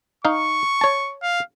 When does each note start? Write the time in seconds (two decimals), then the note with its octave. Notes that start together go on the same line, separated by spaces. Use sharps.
0.25 D#4 F5 C#6
0.81 C#5 A5
1.22 F5